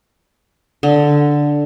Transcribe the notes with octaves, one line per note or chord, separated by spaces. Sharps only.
D3